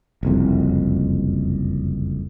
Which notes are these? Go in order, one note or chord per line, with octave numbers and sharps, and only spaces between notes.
F#1 C2 F2